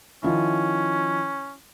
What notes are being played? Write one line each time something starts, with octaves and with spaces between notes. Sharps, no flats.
D#3 F3 C#4 E4